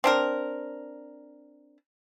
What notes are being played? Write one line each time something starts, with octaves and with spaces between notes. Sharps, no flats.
C4 D4 A#4